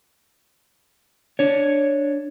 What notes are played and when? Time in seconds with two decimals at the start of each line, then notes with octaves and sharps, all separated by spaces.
1.39 D4 C#5